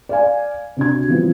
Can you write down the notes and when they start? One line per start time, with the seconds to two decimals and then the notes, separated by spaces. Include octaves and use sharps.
0.09 D5 F5 G#5
0.77 C3 D4 F#4 G#6
1.08 E3 F3 G3 B3 C4